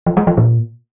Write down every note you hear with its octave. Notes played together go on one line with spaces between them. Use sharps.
F3
G#3
F3
A#2